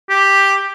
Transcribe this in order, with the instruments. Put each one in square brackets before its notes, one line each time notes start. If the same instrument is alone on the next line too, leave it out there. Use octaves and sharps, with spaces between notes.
[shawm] G4